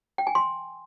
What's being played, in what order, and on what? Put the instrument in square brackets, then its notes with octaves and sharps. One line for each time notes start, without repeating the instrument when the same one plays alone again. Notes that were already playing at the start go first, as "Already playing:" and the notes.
[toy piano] G5
G#5
C6